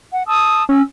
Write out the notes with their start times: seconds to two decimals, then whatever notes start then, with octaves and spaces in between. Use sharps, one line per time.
0.12 F#5
0.28 A5 D#6 E6
0.69 C#4 E6